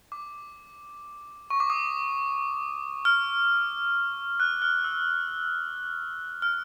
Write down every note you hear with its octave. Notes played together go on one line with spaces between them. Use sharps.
D6
C#6
D6
D#6
F6
F#6
F6
E6
F6